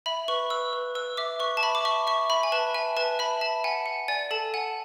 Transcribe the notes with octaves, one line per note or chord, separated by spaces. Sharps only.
E5 B5
B4 C#6
B4 E6
B4
B4 E6
E5 D6
B4 C#6
A5
E5 B5
D6
E5 C#6
E5 C#6
E5 B5
G#5
B4 A5
E5 G#5
B4 A5
E5 B5
E5 A5
F#5 G#5
F#5
D5 G#5
A4 A5
F#5 G#5